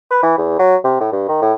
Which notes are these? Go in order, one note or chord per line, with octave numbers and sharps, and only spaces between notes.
B4
E3
E2
F#3
C3
A2
G2
D#3
A2